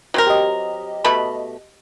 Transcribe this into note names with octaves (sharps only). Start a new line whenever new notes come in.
F#3 C4 A#4
G4 D#5
B2 A3 B5